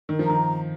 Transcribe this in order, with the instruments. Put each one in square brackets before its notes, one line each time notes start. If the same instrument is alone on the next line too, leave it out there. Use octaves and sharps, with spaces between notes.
[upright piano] D#3 [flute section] A#4
[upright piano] F3
[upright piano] D#3 [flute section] A#5